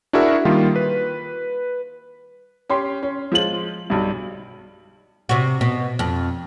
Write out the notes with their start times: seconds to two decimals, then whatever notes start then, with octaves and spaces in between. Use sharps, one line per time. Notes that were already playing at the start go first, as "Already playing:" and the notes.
0.13 D4 E4 F#4 G#4 A#4 E5
0.45 D#3 G3 A#3 F4
0.76 B4
2.69 C#4 G4 C6
3.03 C#4
3.32 F3 G#3 F4 F#7
3.90 B1 G2
5.29 C3 F#4
5.61 B2
5.99 F2